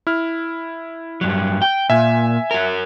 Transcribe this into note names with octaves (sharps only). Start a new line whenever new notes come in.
E4 F6
G2 F#3
G5
A#2 E5 G#5
F#4 A#4